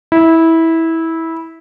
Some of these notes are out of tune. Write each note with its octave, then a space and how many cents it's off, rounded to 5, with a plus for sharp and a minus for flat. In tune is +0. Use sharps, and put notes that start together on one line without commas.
E4 -15